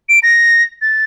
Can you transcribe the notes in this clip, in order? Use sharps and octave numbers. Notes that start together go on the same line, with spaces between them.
D7
A#6
A6